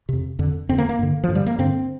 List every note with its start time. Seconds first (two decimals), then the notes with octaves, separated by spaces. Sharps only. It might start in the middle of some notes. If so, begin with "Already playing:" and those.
0.09 F2 C3
0.39 F2 D3
0.69 F2 D3 C4
0.78 A#3
0.89 A#3
0.99 G2 D3
1.24 F3
1.29 G2 D3
1.35 G3
1.46 A#3
1.58 G2 D3 C4